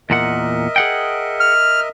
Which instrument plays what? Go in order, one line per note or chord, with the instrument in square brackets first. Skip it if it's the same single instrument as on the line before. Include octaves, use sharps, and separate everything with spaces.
[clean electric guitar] E2 A#2 F#5 [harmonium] A#4 D#5 E5
[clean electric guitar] G#4 F#5 G5
[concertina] F6